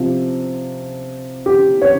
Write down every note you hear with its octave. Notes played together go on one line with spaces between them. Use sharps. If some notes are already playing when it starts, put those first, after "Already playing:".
Already playing: C3 F3
G4
C#5